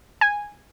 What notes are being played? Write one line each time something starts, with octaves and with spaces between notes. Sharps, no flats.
G#5